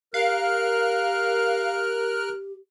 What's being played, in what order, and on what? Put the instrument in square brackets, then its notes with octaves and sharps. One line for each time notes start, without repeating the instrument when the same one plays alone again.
[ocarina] G4 [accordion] A#4 F6 F#6 [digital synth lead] F5